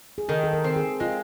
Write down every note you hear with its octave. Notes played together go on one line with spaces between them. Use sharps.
G#4
D#3 A4
A4
A#4
C4
G#4
G#3 F4